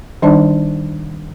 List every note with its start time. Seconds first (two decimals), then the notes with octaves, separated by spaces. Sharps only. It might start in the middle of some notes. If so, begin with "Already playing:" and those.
0.22 D#3 G3 D4 D#4 D5 A5